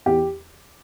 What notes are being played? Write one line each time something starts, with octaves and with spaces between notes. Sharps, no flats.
E2 G4